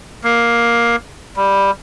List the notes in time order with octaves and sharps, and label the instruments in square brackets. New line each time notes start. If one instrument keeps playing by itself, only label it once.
[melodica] A#3
G3